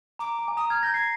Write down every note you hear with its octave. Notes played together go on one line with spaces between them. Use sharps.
A#5 D6
A#5
G#5
A#5 D#6
F6 G#6
G6 A#6
G#6 C7